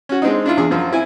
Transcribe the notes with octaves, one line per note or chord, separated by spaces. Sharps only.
C#4 F#4
G#3 C4 D4 D#4
D4 E4 F4
E2 D4 G#4
F#2 F3
C4 E4 G#5